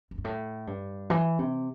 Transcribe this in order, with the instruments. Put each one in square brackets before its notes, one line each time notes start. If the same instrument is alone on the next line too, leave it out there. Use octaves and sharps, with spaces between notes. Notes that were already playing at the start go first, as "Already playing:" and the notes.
[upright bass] E2
G2
A2
G2
E3
C3